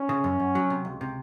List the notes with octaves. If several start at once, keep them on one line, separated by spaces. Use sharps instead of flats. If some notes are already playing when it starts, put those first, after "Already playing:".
Already playing: C#4
C#3
F#2
F#2
F#3
C3
C#2
C3